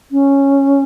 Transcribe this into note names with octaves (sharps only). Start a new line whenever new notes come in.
C#4